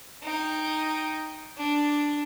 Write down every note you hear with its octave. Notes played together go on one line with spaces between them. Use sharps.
D#4 G5
D4